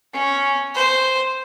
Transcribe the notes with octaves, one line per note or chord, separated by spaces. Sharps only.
C#4
C5